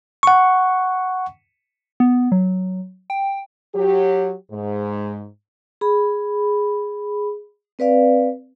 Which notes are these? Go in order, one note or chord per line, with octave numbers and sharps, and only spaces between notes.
F#5 C#6
B3
F#3
G5
F#3 G4
G#2
G#4 B5
C4 B4 D5 F5